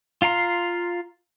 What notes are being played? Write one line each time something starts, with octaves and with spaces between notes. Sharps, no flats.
F4 F5 A#5 C6